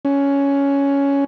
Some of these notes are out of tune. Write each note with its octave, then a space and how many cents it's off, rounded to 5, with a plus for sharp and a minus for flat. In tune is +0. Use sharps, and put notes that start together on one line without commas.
C#4 +10